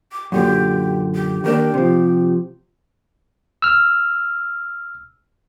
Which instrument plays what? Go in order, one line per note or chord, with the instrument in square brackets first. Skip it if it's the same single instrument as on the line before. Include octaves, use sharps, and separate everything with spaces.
[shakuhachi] D6
[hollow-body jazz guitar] F#2 A#2 D3 [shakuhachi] G4
[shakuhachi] G4
[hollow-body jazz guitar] D#2 A#3 D4 [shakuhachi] G4
[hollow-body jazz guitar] C3 F3
[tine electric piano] E6 F6